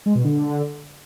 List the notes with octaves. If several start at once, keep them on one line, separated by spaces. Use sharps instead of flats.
G#3
B2
D3